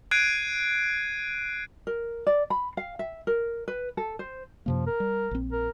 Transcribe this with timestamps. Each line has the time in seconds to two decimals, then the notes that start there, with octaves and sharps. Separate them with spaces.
0.11 F#6 G#6 C7 D7 D#7
1.87 A#4
2.27 D5
2.50 B5
2.77 F5
2.99 E5
3.27 A#4
3.68 B4
3.97 A4
4.19 C5
4.66 F#2 C3 F3 A#3
4.86 A#4
5.00 G3
5.31 A#1 C4
5.52 A#4